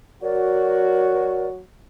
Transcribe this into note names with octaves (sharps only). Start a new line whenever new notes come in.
F#3 F#4 A#4 D5